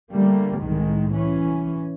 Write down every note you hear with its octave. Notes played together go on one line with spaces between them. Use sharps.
D3 G3 A3 A#3
C2 A2 D#3 G#3
E3 C#4